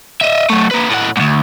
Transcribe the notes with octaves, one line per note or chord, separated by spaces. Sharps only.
D#5 E5
F#3 A3
A#3 B4
A2 F#5
D2 G#2